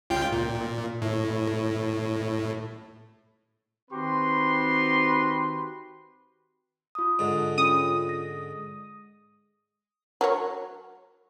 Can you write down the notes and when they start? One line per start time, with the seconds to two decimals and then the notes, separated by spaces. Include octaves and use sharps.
0.10 C#2 F4 G5
0.32 A#2
1.02 A2
3.90 D#3 C4 F#4 G4 B4 C6
6.95 F4 D#6
7.19 G#2 D3
7.58 C#4 F4 D#6
8.09 A#6
10.21 F#3 A#4 C#5